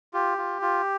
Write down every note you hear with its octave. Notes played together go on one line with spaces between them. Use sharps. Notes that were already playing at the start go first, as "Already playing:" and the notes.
F4 G4
F4
F4